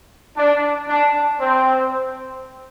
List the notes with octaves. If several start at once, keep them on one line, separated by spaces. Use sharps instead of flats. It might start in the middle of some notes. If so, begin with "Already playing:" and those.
D4
D4
C4